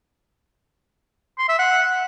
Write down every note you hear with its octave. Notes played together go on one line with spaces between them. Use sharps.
C6
E5
F#5